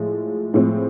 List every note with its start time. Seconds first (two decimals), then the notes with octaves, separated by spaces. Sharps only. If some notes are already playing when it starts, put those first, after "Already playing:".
Already playing: A2 F3 G#3
0.54 A2 F3 G#3 C4